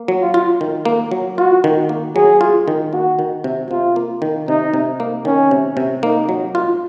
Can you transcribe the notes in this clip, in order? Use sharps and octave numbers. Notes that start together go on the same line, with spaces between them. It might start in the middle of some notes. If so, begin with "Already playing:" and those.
Already playing: A#3
F#3
F4
F4
D#3
A#3
F#3
F4 F#4
D#3
A#3
F#3 G#4
F4
D#3
A#3 F#4
D#3
C3
C3 F4
A#3
D#3
C3 D#4
C3
A#3
D#3 C#4
C3
C3
A#3 D#4
F#3
F4